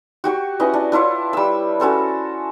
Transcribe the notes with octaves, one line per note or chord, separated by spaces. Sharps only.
F#4 G4 C#6
C#4 E4 B4 D#5
D4
D4 E4 F4 C#5
G3 E6
C#4 F#4 A4 C5